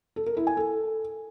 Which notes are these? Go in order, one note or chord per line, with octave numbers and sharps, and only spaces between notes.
A4
A#4
E4
G#5
A4